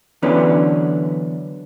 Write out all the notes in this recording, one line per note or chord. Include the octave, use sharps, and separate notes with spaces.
D3 E3 F#3 B3 C#4 D4